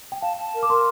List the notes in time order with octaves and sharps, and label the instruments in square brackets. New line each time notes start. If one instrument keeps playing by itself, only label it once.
[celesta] G5
[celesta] F5 [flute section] A5
[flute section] A5
A#4
[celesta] D6
[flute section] A#4 [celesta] C6